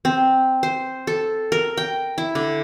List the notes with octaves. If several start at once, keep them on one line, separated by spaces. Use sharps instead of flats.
C4
C5
A4
A#4
G5
E4
D3